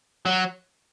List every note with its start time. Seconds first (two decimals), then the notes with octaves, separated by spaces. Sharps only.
0.26 F#3